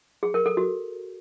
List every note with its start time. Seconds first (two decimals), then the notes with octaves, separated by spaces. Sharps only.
0.23 G#4
0.34 A#4
0.46 A4
0.57 F#4